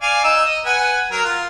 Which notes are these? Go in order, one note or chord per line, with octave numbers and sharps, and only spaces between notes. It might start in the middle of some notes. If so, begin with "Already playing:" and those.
D5 F5 G#5
D#4 E6
D#5
B4 F#5 G#5
F#3 A#4
F4